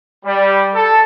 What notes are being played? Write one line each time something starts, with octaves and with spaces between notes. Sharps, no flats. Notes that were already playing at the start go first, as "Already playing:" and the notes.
G3
A4